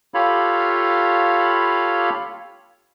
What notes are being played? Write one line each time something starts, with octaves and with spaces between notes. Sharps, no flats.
F4 G4 A4 C#5 F5 B5